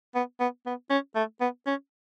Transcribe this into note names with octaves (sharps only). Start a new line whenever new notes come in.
B3
B3
B3
C#4
A3
B3
C#4